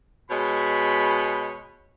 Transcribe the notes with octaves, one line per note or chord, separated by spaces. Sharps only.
B2 G#3 C#5 B5